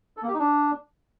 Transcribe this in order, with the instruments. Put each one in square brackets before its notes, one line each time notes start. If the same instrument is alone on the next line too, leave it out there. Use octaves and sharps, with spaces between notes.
[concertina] A4
A#3
G4
D#4
D4